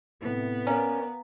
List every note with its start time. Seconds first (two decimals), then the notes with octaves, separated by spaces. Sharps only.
0.22 A2 C3 B3
0.67 C#4 A#4 C#5 D5 F5 G#5 A#5